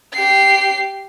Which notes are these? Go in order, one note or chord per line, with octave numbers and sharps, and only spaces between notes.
G4 C7